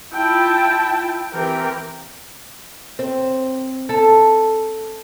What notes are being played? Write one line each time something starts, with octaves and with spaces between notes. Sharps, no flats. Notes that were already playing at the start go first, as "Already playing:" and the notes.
E4 F4 G5 A5
E3 C4 G4 A#4 G5
C4
A4